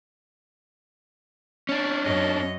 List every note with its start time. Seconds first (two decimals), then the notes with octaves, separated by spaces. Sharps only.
1.69 C#4 D4
2.04 F#2 C#5 D#5